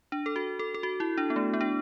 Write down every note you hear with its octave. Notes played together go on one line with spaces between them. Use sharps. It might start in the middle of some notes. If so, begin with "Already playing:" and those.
D4
A4
F#4
A4
A4
F#4
E4
D4
B3
A3
B3
D4